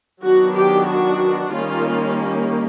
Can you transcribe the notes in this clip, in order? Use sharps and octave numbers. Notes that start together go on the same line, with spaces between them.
D#3 F#3 B3 D4 F#4
G4
F#4
D#3 G3 A#3 C#4 F4